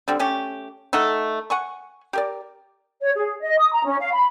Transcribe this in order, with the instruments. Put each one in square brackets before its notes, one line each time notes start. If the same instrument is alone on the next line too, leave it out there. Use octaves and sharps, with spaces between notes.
[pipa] D3 G3 C4
A3 C#4 G4
A3 D#4 A4 F#5
F#5 G#5 C#6
G4 A#4 D5
[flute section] C#5
G#4
D#5
D#6
A#5
C#4
F5
B5